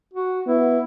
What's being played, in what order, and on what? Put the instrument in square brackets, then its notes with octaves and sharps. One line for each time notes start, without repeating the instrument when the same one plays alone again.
[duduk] F#4
[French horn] B3 [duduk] E4